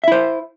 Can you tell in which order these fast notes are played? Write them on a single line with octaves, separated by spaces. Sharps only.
E5 E4 C5